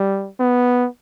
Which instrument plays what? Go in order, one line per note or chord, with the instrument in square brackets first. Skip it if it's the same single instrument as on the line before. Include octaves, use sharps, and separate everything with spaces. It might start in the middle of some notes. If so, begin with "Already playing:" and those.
Already playing: [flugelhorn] G3
B3